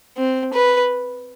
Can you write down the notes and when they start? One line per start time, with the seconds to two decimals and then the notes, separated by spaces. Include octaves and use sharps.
0.17 C4
0.54 B4